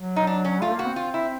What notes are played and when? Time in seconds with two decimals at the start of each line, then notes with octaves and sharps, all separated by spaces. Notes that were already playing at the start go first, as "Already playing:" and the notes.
Already playing: F#3
0.16 D#4
0.27 D4
0.45 C#4
0.62 A3 F4
0.73 A#3
0.79 F#4
0.85 C4
0.96 F4
1.14 E4